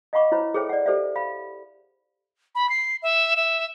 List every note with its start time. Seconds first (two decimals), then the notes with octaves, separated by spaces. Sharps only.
0.13 D#5 F5 F#5 B5 C#6 D6
0.32 E4 C5 C#5 B5
0.54 G#4 A4 C5 C#5 E5 G5
0.69 D5 F#5
0.86 G4 A4 C5 D5 E5
1.16 F5 B5
2.55 B5
2.69 C7
3.02 E5
3.37 E5